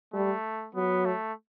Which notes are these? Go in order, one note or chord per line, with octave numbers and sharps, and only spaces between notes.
G3 A3
F#3 B3
A3